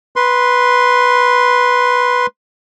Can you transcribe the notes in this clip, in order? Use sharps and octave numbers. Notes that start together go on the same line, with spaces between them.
B4 C6